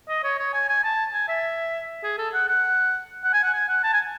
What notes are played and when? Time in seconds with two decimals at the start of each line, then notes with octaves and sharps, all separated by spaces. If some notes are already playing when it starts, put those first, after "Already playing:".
0.09 D#5
0.24 C#5
0.39 C#5
0.54 G#5
0.69 G#5
0.84 A5
1.13 G#5
1.29 E5
2.03 G#4
2.18 A4
2.34 F#5
2.48 F#5
3.24 F#5
3.33 G#5
3.43 F#5
3.54 G#5
3.68 F#5
3.84 A5
3.93 G#5